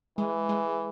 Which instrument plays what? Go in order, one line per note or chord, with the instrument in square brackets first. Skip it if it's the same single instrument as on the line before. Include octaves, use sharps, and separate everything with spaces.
[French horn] E3 [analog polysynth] G#3
[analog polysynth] G#3